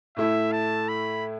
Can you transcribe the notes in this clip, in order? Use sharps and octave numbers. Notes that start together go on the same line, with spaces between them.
A2 A3 E4 E5
A5
B5